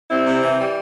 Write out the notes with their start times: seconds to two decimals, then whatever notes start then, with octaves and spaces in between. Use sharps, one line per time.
0.09 G3 C4 E4
0.25 C3
0.42 E3
0.58 G3